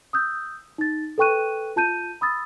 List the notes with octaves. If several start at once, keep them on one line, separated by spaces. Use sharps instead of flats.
D#6 E6 G6
D#4 A6
A4 B4 G5 C#6 F#6 D#7
F4 A5 G6 D#7
B5 D#6 E6 A6